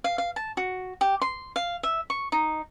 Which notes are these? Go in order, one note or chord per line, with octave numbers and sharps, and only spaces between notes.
F5
F5
A5
F#4
G4
C6
F5
E5
C#6
D#4